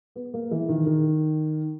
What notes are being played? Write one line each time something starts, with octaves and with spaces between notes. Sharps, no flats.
B3
A#3
E3
D#3
D#3